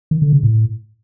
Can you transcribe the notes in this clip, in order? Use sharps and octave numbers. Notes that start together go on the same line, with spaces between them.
D#3
D3
C#3
A2